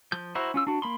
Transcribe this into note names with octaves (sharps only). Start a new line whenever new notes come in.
F3 G6
E4 F#4 C5 A#5
C#4 F4 E6
D4 F#4
A#3 B5 C6